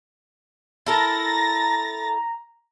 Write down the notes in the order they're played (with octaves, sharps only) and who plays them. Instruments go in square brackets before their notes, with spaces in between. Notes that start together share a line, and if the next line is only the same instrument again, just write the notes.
[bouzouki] E4 A4 A#4 [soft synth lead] A#5 [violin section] A6 A#6